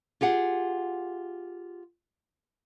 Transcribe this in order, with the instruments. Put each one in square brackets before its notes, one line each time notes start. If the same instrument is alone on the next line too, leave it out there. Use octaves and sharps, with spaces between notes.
[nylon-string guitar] F4 G4 G#4 F#5